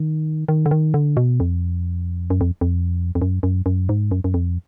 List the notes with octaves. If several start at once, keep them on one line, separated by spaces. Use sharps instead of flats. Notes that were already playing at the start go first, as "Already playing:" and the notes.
Already playing: D#3
D#3
D3
D#3
D3
B2
F2
F#2
F2
F2
F2
F#2
F#2
F#2
G#2
F#2
F#2
F2